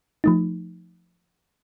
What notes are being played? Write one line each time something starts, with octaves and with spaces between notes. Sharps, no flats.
F3 A3 D#4